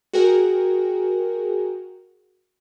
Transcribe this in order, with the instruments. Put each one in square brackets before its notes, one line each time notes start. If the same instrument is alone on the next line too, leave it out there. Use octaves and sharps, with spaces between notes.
[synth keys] F#4 G#4 A#4 G5 G#5